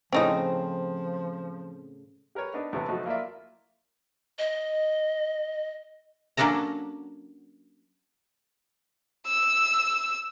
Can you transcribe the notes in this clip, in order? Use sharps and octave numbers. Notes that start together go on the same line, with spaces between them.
A2 C#3 F3 C4 C#4 D#4 D#5
G4 A#4 B4 C#5
B3 D4 D#4
A2 C3 E3 B3
F3 F#3 A3 D#4 F#4
A#3 E4 F4 A#4 D5 E5
D#5
F#3 A#3 C#4 D4 A4 A#5
E6